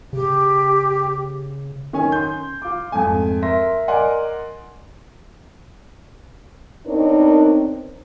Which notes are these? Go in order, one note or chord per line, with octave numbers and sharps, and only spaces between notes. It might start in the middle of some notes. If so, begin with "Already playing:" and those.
C#3 G4
D#3 C#4 G#5
C6 G6
F4 D6
F2 G#2 A3 G#5
A#4 E5 C6 A#6
A#4 D5 D#5 F#5 G#5 C6
B3 C4 D4 D#4 A#4 C#5